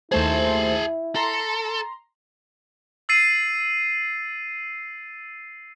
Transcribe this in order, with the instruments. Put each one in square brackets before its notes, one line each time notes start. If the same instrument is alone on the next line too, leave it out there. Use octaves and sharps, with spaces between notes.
[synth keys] D#2 A3 C5 [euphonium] E4 [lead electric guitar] G#4 A5
[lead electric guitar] A4 [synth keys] A#5 C6
[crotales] E6 A6 C7 D#7